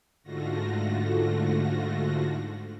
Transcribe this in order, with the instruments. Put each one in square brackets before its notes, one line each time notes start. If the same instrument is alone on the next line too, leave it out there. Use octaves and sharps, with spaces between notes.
[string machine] G#2 D3 A3 F4 F#4 A#6